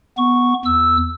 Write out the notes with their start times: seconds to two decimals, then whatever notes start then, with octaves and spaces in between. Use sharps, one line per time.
0.18 B3 C#6
0.65 E2 E6